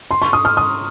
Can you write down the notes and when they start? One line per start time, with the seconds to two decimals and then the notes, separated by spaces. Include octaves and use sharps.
0.11 C6
0.22 C#6
0.33 D#6
0.45 F6
0.57 D#6